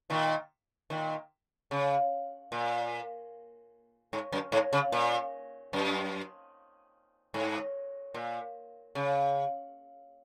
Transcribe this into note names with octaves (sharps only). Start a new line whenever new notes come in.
A#2 D#3
A#2 D#3
C#3
A#2
G#2
F#2
G#2
C#3
A#2
F#2
G#2
A#2
C#3